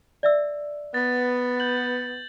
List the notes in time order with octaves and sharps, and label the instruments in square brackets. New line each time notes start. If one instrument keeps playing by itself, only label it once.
[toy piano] D5 E5 E6
[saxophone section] B3 [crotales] A6
[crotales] G6 F#7